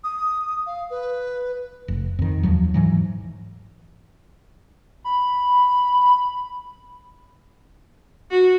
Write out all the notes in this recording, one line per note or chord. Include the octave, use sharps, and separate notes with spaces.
D#6
F5
B4
F1
F2 D#3
D#2 F3 F#3
G#2 E3 F#3
B5
F#4